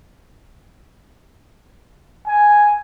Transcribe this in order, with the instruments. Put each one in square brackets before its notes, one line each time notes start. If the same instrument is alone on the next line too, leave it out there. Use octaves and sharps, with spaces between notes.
[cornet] G#5